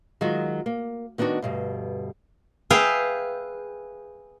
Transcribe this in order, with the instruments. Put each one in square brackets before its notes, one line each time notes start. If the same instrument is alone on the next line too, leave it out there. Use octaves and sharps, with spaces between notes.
[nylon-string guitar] D#3 F#3 G#3 F4 F#4
A#3
D#3 B3 D4 D#4 F#4
D2 G2 B2
[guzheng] G#4 B4 E5 F5 G5